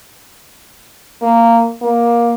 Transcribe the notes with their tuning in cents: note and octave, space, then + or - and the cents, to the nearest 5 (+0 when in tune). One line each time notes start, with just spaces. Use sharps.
A#3 -10
A#3 +15